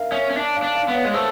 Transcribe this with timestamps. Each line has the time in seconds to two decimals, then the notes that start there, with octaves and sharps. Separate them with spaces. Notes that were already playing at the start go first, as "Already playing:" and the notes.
Already playing: A#4 E5 F5
0.12 C#4 E5
0.31 C#4
0.37 D4
0.57 F5
0.62 D4
0.75 F5
0.88 B3
0.95 C#5
1.05 G#3
1.14 A3 C5